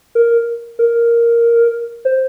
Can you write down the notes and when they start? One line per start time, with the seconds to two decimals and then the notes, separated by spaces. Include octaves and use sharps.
0.15 A#4
0.79 A#4
2.05 C5